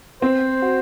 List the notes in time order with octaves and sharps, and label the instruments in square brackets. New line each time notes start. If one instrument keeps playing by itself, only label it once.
[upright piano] C4 [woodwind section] C5
[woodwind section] F#4